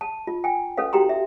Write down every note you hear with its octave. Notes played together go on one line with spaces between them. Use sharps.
A5
F4
G5 G#5
C#4 A4 B4 F5
E4 F#4 G4 G5 A#5 C6
E5